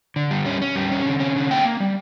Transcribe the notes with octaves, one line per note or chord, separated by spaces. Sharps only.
D3
G3
C#4
C#4
G3
C#4
D3
C#4
D3
A#3 G5
A#3
G3